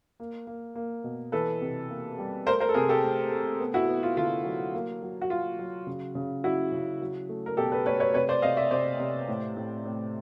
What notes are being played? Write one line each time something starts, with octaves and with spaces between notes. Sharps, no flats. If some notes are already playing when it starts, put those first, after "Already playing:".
A#3
A#3
A#3
B2
E3 A4 B4
C3
A#3
G3
A3 A#4 C5
A#4 C5
A4
C3 G#4 A#4
G4 A4
A3
A3
B3
E4 F#4
B3
F4
D3 F4
F#3
A#3
F#3
F#4
F#3 F4
F#3
C#3
C#3
F#3 E4 F#4
C#3
F#3
A3
A#4
B2 G4 A4
A4 B4
A3 B4 C#5
B4 C#5
C3 B4 C#5
C5 D5
C3 D#5 F5
D5 E5
C3 C5 D5
C3
A2
A2
A2